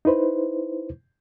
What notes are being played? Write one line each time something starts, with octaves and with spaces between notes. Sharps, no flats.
D#4 E4 B4 C5